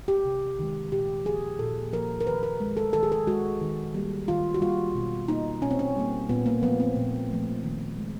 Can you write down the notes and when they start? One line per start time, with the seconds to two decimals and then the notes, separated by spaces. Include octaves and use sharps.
0.08 G4
0.25 C3
0.59 D#3 G#3
0.92 A#2 G4
1.25 F3 A#3 G#4
1.59 A#2 A4
1.93 F3 A#3 A#4
2.21 A#4
2.26 D#3 B4
2.43 A#4
2.60 G#3
2.77 A4
2.93 D#3 A4
3.03 G#4
3.12 A4
3.27 G#3 F#4
3.61 D#3
3.94 G3 A#3
4.28 D#3 F4
4.54 F#4
4.61 G3 A#3 F4
4.95 B2
5.28 G3 A#3 D#4
5.62 B2 C#4
5.71 C4
5.79 C#4
5.96 G3 A#3
6.29 A#2 B3
6.46 A#3
6.63 F3 A3 B3
6.80 C4
6.96 A#2
7.30 F3 A3
7.63 D#3
7.97 G#3